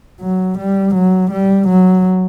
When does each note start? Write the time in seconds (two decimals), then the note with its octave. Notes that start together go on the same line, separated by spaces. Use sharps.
0.21 F#3
0.58 G3
0.95 F#3
1.31 G3
1.68 F#3